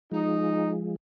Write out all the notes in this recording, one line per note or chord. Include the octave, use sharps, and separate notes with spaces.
F3 G#3 D#4